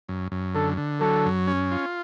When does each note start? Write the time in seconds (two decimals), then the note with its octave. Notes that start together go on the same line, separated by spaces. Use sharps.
0.09 F#2
0.32 F#2
0.55 D3 A4
0.78 D3
1.01 F#3 A4
1.25 F#2
1.47 C#4
1.72 F4